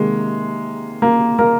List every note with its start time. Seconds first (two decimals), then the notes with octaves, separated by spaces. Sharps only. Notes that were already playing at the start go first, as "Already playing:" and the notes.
Already playing: C3 D#3 G#3 A#3
1.02 A#3 A#4
1.39 A#3 A#4